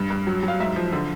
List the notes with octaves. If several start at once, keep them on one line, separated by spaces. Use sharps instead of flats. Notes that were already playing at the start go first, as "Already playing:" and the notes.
Already playing: G2
G2
F#3
F#3
F5
G#2 E5
F3
D3